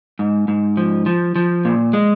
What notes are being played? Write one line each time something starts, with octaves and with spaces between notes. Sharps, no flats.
G#2
G#2
F3
F3
F3
A#2
G#3